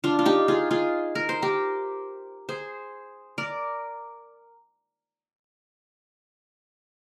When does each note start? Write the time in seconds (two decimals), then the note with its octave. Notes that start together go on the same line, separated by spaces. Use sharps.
0.04 D4 F4
0.19 F4
0.25 D#4 G4
0.48 F4 G#4
0.71 F4 G#4
1.15 A#4
1.29 C5
1.42 G4 A#4
2.49 G#4 C5
3.38 A#4 D5